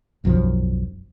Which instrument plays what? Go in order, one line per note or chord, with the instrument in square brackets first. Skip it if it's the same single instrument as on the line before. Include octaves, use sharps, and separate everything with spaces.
[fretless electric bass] E1 B1 F#2 F3